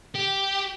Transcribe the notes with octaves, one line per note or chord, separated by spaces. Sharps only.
G4